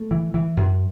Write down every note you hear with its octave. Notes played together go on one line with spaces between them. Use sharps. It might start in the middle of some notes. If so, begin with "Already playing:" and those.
Already playing: A3
E3
E3
F#2